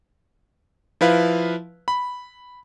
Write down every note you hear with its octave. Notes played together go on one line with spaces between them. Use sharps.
F3 E4 B4 F5
B5